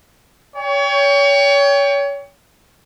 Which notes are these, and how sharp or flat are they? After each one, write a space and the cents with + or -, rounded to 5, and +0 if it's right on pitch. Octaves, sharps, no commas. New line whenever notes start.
C#5 +30 G5 +25